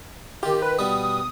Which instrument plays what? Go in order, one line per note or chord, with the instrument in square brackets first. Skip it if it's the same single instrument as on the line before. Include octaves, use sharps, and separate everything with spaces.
[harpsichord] D#3 F4 [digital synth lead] G4
[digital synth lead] B4
[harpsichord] B2 G3 B4 [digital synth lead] D#6